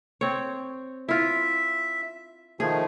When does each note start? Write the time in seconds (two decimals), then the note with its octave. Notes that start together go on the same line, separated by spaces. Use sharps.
0.21 C4 C#5
1.09 E4 F4 E5
2.60 D#3 F3 A3 G#4